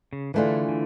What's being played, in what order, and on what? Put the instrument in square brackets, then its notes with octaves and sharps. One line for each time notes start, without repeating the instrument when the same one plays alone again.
[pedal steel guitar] C#3
[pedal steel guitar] D3 [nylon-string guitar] E3 A3 D4 F4 G#4
[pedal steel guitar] D3